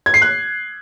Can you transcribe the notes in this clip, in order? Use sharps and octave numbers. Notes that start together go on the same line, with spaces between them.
G#6
C7
F#6